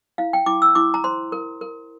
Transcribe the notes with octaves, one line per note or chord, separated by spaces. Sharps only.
E4 F5
G5
E4 D6
E6
E4 D6
A#5
C5 C6
A#4
A#4